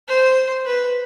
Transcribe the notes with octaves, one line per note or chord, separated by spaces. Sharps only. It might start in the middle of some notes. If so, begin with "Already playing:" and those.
C5
B4